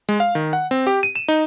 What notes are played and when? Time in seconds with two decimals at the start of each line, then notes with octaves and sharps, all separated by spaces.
0.09 G#3
0.20 F5
0.35 D#3
0.53 F#5
0.71 C4
0.87 G4
1.03 D#7
1.15 E7
1.28 D#4